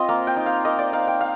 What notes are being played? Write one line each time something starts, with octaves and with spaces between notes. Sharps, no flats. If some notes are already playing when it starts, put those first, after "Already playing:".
Already playing: C4 F4 D#5
A#3 F5
G5
D#4
F5
A#3 D#5
D5
D#4 F5
G5
F5